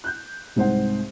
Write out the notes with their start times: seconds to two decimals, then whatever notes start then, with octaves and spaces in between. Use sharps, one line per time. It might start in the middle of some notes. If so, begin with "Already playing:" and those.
0.04 F#6 G6
0.56 C2 G#2 C4 C5 F#5